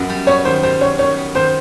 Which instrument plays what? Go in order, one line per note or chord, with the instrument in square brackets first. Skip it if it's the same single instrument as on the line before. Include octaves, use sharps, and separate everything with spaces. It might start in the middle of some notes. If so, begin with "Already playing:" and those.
Already playing: [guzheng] F#2 B3
G3
[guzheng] B3 [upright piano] C#5
[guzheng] D#3 [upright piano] C5
[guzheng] G3 [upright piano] C5
[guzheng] F#2 [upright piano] C#5
[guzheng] D#3 [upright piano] C#5
[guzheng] B3
[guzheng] D#3 [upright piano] C5